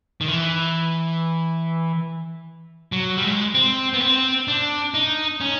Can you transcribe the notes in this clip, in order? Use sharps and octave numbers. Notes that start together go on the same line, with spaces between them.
D#3
E3
F#3
G3
G#3
C4
B3
C4
D4
D#4
C#4